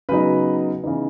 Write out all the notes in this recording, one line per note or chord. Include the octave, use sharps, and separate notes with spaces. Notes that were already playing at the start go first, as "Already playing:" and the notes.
C#3 F#3 B3 D#4 B4
C#3 E3 B3 D#4